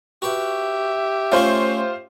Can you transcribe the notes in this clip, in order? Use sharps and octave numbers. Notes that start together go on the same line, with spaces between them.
F#4 G4 B4 E5
A3 C#4 F4 C5 G#5